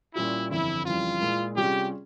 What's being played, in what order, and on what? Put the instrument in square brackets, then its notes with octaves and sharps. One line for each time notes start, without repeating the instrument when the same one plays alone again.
[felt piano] A#2 G3 C#4 F4 [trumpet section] E4
[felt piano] G1 F2 E3 [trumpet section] E4
[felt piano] F2 C#3 E3 G3 [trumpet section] F4
[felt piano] A#2 G#3 E4
[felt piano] C3 G3 C#4 F4 G#4 [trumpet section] G4